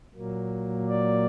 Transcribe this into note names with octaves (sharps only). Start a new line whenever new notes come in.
A#2 F#3 A#3
D5